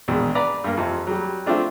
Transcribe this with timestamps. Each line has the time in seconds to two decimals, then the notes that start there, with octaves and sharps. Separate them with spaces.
0.08 A#1 B2 D#3 G#3
0.35 B4 D5 A#5
0.64 G2 A#3
0.77 F2 C3
1.07 F#3 G3
1.46 F3 A3 C4 D4 F4